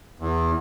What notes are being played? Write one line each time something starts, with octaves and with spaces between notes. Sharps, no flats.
E2